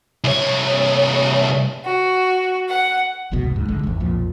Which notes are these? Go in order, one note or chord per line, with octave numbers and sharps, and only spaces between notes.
C2 C#5
F#4
F#5
G1 C2 F2 B2
C2 G2
C#2 G#2
A1 D3 G#3
G#1 E2
B1 F2 A#2 F3